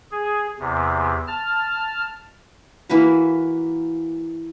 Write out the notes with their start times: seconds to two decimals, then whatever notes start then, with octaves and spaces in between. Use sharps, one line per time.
0.11 G#4
0.59 E2 C3
1.27 A5 F6
2.89 E3 A#3 F#4 B4